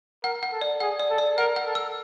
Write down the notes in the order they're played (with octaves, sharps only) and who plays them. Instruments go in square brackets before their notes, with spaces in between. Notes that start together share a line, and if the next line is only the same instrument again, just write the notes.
[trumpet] A#4 [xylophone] F#5
[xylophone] F#5
[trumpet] A4
[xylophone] D5
[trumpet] G#4 [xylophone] F#5
[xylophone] D5
[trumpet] A4
[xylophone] D5
[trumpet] A#4 [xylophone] F#5
[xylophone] F#5
[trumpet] A4
[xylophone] E6